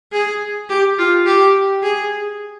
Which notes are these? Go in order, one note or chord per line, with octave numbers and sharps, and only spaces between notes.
G#4
G4
F4
G4
G#4